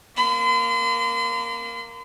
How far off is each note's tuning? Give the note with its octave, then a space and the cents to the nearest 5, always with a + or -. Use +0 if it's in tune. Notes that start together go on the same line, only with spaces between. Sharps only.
A#3 +0 C6 -45